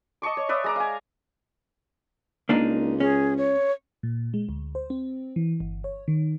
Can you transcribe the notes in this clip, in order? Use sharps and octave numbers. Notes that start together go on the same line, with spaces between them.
D#5 A5 C#6 D6
C#5
B4 D5 E5 D#6
G#3 A#5 D6
F5 G#5
C#2 A#3 D4 D#4
C#4 G#4
C#5
A#2
G#3
D2
C5
C4
E3
G1
C#5
D#3